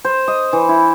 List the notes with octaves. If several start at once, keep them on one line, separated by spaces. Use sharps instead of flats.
C5
D#5
E3
E4